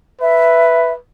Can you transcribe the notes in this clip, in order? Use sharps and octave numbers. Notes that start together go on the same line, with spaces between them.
B4 E5